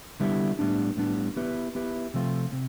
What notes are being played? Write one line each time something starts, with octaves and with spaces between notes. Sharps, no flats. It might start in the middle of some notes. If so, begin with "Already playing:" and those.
D3 G3 B3 E4 G4
A2 G3 B3 D4
A2 G3 B3 D4
B3 E4 G4 B4
B3 E4 G4 B4
C3 F3 A3 C4 F4
C3